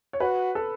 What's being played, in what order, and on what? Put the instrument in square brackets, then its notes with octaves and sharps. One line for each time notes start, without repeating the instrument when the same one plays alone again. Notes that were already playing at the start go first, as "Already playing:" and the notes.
[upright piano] C#5
[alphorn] F#4 [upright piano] B4
[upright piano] A4